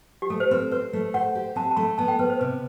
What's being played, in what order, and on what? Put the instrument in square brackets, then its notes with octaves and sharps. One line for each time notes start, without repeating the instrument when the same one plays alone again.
[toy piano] G4
[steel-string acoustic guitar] A3 [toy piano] A4
[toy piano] C5
[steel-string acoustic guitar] C4 [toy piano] B4
[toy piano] B4 [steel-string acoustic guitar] C5
[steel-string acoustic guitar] A3
[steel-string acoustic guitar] C5 [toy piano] F#5
[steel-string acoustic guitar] G4
[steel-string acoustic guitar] C4 [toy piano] A5
[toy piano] A5
[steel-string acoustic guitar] A3 [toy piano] B5
[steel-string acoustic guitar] B3 [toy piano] A5
[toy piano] G5
[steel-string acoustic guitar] B3 [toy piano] B4
[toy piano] C5
[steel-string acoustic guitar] C3 [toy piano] B4